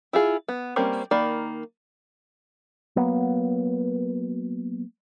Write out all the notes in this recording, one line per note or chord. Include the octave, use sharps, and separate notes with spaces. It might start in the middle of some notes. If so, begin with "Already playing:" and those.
E4 F4 G#4
B3
G3 A#3 C4 C#4 C#5
D#3 A#3 D5 B5
F#3 A#3 B3